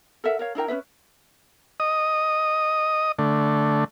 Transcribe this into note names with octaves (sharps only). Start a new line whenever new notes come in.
A4 A#4 E5 F#5
A#4 C#5 F5
D4 E4 A#4 G5
C#4 E4 B4 E5
D#5 D#6
D3 A3